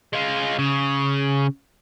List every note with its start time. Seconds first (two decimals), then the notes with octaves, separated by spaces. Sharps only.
0.13 G#3 F4
0.59 C#3